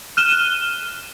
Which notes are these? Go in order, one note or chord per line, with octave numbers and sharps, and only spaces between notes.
F6 F#6 D#7 E7 G7